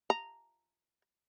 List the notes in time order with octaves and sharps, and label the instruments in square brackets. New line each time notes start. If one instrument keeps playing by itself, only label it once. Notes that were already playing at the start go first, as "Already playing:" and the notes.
[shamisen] A#5